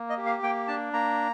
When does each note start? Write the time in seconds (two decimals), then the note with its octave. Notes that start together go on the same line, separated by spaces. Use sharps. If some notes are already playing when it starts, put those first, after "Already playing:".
Already playing: A#3
0.09 D#5
0.17 G4
0.26 F5
0.43 A#3 G5
0.68 D4 A5
0.93 A#3 A#5